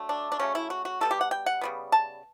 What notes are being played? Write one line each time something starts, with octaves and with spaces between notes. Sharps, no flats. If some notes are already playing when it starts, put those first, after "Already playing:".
Already playing: D3 F#3 A3
D4
D4
C#3 F#3 A3 C#4
E4
F#4
F#4
B2 G3 B3 A4
G4
F#5
G5
F#5
C#3 G3 B3
A5